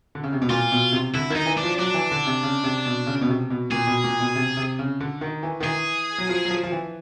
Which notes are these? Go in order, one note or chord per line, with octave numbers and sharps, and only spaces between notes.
D3
C#3
C3
B2
A#2 F4
B2
C3
D3 E4
D#3
D#4
E3
D4
F3
F#3 D4
E3
D3
C3
C#3
C3
B2
C#3
B2
C3
B2
A#2 G#4
B2
A#2
B2
C3
C3
C#3
D3
D#3
E3
D#3
E3 G#4
F#3
F3
F#3
F3
F3
E3